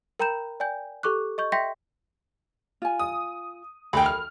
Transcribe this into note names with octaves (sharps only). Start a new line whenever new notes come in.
A#4 G5 A#5 B5 G6 E7
D5 G5 G#5 G6
G4 A4 C#6 D6 F#6
D#5 C#6 G6
E5 G5 C6 G6 A#6 B6
F4 G#5
D#6
D2 A#4 G5 B5
F6